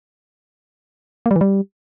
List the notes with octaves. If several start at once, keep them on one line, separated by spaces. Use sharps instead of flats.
A#3
G3
E3
G3